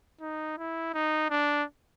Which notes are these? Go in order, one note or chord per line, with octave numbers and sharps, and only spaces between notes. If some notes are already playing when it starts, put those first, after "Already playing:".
D#4
E4
D#4
D4